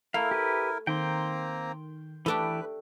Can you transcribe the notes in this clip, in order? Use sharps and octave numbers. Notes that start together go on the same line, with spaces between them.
A3 E4 A#4 F5
G4 B4
D#3 A#3 C4 G5 A#5 C6
E3 A3 D4 G4 A4 B4 G5